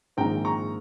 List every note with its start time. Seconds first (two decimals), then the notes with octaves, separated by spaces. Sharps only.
0.17 A#1 G#2 D#3 G#3 C4 G5 A#5
0.45 A#5 C#6